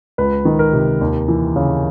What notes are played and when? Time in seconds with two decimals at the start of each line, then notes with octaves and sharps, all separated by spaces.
0.18 C#2 B4
0.45 D#3
0.59 A#4
0.73 C3
1.01 D#2
1.28 E3
1.56 C#3